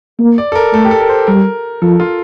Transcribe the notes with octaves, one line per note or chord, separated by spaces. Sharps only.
A#3
D5
A4
A#4
A3 A4
G4
A4
A#4
C5
G3 A#4
F3 A4
F4